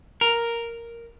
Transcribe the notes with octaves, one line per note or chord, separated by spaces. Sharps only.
A#4